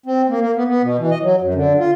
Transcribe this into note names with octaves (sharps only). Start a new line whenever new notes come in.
C4
A#3
A#3
B3
B3
B2
E3
D#5
F#3
F#2
D3
F4